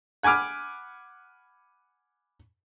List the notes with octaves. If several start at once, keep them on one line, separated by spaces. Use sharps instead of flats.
F#5 G#5 B5 D6 F6